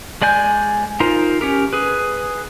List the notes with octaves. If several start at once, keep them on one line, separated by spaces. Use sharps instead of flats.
G#3 D5 G#5 G6
D#4 F4 A#4 C5
C#4 G4 A#4
G#4 B4